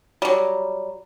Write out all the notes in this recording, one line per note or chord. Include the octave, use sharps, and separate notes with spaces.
F#3 G3